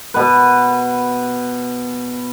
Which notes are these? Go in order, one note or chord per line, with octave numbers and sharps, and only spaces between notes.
B2 B4